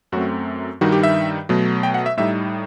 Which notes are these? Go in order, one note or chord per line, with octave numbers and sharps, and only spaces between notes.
F#2 F#3 A3 C4 F#4
G2 D#3 G3 D#4 F#4
G4
E5
B2 F#3 A3
G5
F#5
E5
A2 G3 D#4 E5